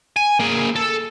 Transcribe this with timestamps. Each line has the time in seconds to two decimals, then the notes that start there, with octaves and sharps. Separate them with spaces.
0.17 G#5
0.40 A#3 G#4
0.76 A4